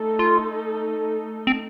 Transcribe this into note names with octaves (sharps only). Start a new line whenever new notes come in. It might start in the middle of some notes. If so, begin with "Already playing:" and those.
Already playing: A3 D#4 A4
F4
C4